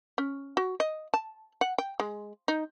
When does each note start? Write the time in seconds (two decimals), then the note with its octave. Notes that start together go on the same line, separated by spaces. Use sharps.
0.18 C#4
0.57 F#4
0.80 D#5
1.14 A5
1.61 F#5
1.78 G5
2.00 G#3
2.48 D#4